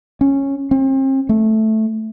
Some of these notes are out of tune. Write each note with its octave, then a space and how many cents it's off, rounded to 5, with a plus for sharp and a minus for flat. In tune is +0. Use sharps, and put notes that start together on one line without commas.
C#4 -10
C4 +40
A3 -5